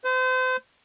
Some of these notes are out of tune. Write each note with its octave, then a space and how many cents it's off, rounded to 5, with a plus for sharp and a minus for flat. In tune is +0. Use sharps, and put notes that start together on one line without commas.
C5 -35